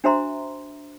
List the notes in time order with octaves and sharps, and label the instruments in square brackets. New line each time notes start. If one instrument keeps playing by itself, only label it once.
[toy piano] D4 F#4 C5 E5 A#5 C6